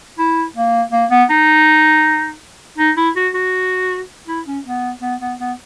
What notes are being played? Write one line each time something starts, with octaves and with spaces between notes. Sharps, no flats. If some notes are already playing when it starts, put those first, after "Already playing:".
E4
A#3
A#3
B3
D#4
D#4
E4
F#4
F#4
E4
C#4
B3
B3
B3
B3